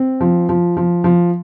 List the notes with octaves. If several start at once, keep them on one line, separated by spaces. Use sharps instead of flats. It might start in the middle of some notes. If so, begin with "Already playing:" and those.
Already playing: C4
F3
F3
F3
F3